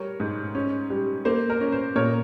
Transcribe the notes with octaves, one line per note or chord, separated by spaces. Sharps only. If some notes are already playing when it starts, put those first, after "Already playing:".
Already playing: G3 A#4 C#5
G#2
C#4
G3
A#3 C5
A#4
C#4
C5
A#2 A#4 C#5